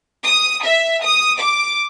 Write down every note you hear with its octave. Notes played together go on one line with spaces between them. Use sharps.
D#6
E5
D#6
D6